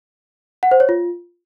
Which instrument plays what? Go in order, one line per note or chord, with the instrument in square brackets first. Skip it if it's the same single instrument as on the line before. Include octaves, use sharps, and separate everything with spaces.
[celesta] F#5
C5
C#5
F4